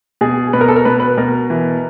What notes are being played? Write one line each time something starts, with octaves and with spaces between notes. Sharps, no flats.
B2 G#4
B2 B4
A#4
A4
A#4
B2 B4
B4
B2 A#4
E3